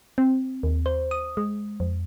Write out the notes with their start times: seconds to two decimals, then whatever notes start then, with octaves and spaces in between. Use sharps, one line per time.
0.18 C4
0.63 D#2
0.86 C5
1.11 D#6
1.37 G#3
1.80 F2